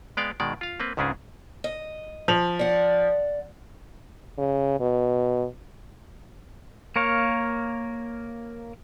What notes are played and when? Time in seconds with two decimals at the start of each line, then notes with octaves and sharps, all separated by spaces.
0.17 G#3 B3 D5 F5 G5
0.40 B2 D#3 G#3 D5
0.61 F4 F5
0.80 A#3 C4 B4
0.97 C#2 G#2 C#3 C#4 D4 G#4
1.64 D#5
2.28 F3 F7 F#7
2.59 D5 F#5
4.38 C#3
4.80 B2
6.96 A#3 A#4 C#5 F5